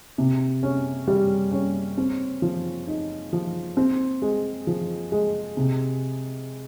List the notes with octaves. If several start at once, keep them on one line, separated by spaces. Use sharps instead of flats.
C3
C#4
G3
C#4
C4
F3
D#4
F3
C4
G#3
F3
G#3
C3